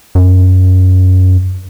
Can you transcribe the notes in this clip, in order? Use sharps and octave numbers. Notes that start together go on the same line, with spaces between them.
F#2